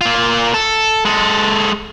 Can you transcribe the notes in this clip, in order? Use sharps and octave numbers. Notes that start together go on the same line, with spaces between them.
A#3 F4
A4
G#3 A4